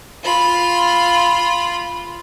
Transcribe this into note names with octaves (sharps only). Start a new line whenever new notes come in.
F4 B5